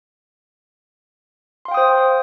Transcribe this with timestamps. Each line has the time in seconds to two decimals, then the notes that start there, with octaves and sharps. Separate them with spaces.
1.65 C6
1.68 F5
1.71 G5
1.74 D#6
1.77 C5